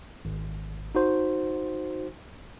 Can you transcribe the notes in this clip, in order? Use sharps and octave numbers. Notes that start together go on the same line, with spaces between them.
G#1
D#4 F#4 C5